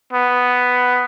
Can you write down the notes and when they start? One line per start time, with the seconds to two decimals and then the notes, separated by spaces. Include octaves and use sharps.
0.13 B3